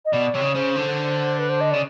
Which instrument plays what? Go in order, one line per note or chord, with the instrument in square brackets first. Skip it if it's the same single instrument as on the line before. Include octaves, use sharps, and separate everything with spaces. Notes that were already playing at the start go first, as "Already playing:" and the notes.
[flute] D#5
[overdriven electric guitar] B2 [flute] D5
[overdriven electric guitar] C3 [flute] C#5
[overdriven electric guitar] C#3
[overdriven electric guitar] C#3 [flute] C5
[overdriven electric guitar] D3
[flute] B4
C5
D#5
[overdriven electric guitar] C#3 [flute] D5